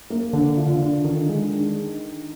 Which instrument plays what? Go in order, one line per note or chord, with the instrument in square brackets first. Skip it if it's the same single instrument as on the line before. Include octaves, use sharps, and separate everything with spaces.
[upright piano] A#3
[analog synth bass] D3 [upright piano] D4
[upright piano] F4
[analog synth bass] D3
[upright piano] D4
[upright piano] D3 [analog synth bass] D#3
[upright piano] G#3
D4